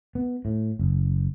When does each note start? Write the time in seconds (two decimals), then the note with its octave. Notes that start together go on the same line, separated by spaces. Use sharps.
0.15 B3
0.45 A2
0.79 F#1